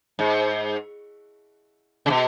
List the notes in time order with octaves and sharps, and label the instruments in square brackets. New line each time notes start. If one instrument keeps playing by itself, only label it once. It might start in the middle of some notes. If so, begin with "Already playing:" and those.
[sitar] G#2
C#3
B2